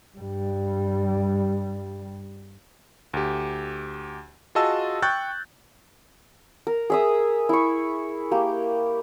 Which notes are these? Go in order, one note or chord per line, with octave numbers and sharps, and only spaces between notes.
G2 G3
D2 G4
F4 F#4 G#4 D#5 A5 E6
G5 C#6 F#6 G6 A6
A#4
G#4 E5 D#6
E4 C#6
A#3 G4